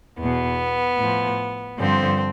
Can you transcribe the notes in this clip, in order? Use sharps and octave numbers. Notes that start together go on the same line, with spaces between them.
E2 B2 B3
A2 F3
G2 D3 F3 C4